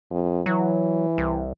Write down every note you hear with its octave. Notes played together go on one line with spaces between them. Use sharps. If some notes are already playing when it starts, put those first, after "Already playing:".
F2
E3 F#3
C2